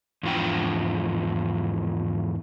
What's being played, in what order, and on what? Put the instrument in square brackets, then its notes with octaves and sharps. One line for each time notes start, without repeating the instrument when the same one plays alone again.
[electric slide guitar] E2 G#2 F3 D4 G5